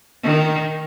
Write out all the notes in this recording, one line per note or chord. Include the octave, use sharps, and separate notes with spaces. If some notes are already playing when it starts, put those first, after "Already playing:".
D#3